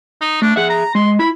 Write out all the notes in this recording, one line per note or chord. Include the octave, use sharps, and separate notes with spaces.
D#4
A3 D4
G#4 E5 F#5
A#5
G#3 C6
E4 B5